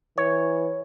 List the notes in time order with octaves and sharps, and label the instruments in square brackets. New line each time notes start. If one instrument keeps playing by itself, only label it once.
[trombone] E3 [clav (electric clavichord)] C#5